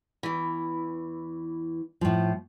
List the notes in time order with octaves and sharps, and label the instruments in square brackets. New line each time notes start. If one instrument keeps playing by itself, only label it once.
[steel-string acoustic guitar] E2 E3
[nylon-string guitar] A2 F3